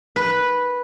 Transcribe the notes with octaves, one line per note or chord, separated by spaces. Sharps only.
B4